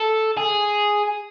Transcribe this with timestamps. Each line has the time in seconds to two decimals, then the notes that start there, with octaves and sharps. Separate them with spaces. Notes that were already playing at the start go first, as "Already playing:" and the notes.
Already playing: A4
0.37 G#4